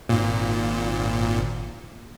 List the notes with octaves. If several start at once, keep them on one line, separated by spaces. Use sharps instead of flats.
G#1 A#2